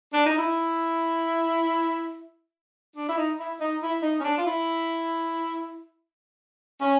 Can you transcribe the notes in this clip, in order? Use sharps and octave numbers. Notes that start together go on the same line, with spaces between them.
D4
D#4
E4
D4
E4
D#4
E4
D#4
E4
D#4
C#4
D4
F4
E4
C#4